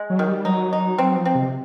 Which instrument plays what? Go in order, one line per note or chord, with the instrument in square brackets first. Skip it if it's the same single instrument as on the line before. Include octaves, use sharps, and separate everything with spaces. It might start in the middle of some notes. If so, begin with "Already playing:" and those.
Already playing: [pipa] G#3
[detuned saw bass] F#3
[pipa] D#3
[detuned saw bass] G3
[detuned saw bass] F#3 [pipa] D#4
[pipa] D#4
[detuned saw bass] F#3 [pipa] C4
[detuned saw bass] F3
[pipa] C4
[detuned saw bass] C3